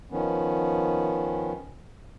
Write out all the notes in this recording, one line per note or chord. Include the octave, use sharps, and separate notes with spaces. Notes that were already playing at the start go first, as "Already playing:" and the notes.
D#3 F3 B3 C#4